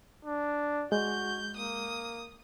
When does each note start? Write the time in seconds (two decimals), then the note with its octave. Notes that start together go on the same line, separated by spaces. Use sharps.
0.25 D4
0.92 G#3 F#4 G6
1.57 A#3 D#6